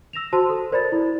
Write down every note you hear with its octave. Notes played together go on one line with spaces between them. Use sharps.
E6 A#6 E7 F7
F#4 C5 A5 C6
A4
A#4 C5 D5 B5 A6
E4